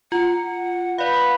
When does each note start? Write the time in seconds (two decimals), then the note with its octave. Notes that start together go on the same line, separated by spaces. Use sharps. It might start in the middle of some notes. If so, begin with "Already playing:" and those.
0.12 F4 F#5
0.98 B4 D5 F5